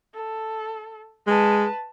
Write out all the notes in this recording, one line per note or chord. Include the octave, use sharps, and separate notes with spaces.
A4
G#3 B4 A5